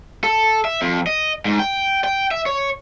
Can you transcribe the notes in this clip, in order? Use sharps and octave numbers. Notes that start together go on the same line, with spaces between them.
A4
E5
F2
D#5
G#2
G5
G5
E5
C#5